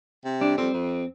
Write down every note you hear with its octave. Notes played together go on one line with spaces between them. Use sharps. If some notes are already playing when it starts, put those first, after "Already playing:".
C3
G3 D4
F2 C4
F2